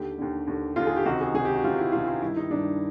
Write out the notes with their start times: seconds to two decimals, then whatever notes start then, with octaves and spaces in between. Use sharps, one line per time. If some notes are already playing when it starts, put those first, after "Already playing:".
Already playing: D#2 D3 G4
0.18 D#2 D3
0.47 D#2 D3
0.76 D#2 D3 F4
0.87 G#4
0.96 G4
1.05 C#2 C3 D#3 F#4
1.21 G#4
1.34 C#2 C3 D#3 G#4
1.45 G4
1.54 F#4
1.64 C#2 C3 D#3 F4
1.78 E4
1.92 C#2 C3 D#3 F4
2.08 F4
2.21 G2 D#3 E4
2.36 D#4
2.50 G2 D#3 D4